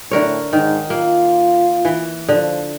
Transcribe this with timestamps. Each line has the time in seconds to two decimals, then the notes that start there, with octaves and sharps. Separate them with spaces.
0.11 A2 D3 A#4 C#5
0.53 G#2 D#3
0.90 A#3 F4
1.85 E3
2.28 D3 F3